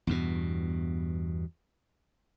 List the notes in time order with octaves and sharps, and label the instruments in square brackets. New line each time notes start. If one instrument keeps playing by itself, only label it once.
[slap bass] E2 G2 B2